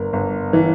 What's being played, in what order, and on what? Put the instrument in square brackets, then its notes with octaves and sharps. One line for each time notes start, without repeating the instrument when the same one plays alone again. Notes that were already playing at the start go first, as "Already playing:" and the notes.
Already playing: [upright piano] G1 A#4
G1
E3